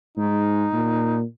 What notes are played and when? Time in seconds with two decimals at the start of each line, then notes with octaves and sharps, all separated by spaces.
0.17 G#2 D#4
0.73 A#2